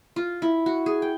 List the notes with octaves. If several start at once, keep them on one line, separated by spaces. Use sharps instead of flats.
F4
E4
F#4
G#4
G5